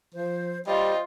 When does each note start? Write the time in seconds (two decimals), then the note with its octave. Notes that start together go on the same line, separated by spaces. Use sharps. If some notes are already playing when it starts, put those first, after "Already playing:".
0.14 F3 C5
0.67 G3 F4 C5 D#5